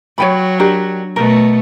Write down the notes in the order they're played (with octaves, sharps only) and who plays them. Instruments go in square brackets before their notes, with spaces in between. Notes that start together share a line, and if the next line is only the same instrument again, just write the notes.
[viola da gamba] F#3 [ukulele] C#5 G5 B5
[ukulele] D4 G4 A#4
[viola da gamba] B2 A3 [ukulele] A#4